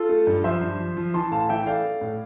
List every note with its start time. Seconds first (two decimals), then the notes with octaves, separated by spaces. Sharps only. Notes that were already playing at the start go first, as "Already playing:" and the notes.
Already playing: F4 A4
0.09 A3
0.27 G2
0.44 F3 C5 E5
0.61 G2
0.79 F3
0.97 F3
1.14 E3 A5 C6
1.31 A2 F5 A5
1.49 E3 E5 G5
1.63 G5
1.66 A3 D5 F5
1.84 A3
2.01 A2